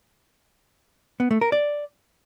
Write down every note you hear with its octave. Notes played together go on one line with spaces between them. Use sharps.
B3
A3
A#4
D5